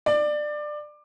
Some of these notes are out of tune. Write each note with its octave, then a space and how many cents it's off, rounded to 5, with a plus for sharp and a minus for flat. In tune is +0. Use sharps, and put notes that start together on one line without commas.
D5 +20